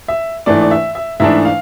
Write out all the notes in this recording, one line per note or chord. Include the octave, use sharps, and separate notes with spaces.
E5
G#2 E3 A3 D4 D5
D5
E5
E5
G#2 E3 A3 D4 E5
F5